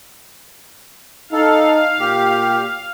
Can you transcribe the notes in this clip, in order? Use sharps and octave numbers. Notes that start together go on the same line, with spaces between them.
D#4 A4 F5
A#2 G4